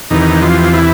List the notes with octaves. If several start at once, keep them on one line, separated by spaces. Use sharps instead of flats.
E2 C3 D#3 E3 D#4
F3 F4
E3 E4